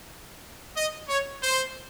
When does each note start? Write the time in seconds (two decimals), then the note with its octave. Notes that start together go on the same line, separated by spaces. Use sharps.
0.77 D#5
1.09 C#5
1.42 C5